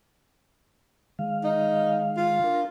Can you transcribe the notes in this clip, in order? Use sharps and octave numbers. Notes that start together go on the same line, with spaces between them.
D#3 G#3 F5
D#4
F4
D4 A#4